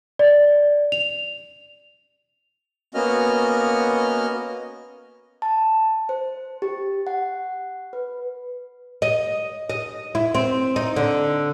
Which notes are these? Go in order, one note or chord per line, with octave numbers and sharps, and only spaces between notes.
D5
F7
A#3 B3 C#4 F#4 D#5 F6
A5
C5
G4
F#5
B4
D#5
D#5
E4
C4
D#4
D3